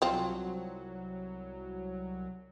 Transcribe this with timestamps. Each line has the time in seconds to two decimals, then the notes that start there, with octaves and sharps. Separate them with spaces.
0.02 C2 F3 F#3 C4